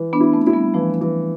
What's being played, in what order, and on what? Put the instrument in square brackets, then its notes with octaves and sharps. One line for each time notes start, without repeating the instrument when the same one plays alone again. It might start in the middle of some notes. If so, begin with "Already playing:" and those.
Already playing: [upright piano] E3
[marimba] B3 D4
[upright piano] E4
[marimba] A3 C4
[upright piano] E4
[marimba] G3 B3
[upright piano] E3 [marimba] F3 A3
[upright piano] E3